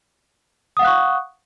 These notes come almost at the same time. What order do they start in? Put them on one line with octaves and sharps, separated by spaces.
D#6 F#5 F5 F#6 C#6